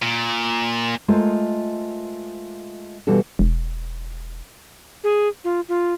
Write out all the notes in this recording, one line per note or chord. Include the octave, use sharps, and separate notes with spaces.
A#2
G#3 A3 F4 A#4 C5 D#5
B2 E3 G3 F4 F#4 A4
E1
G#4
F4
F4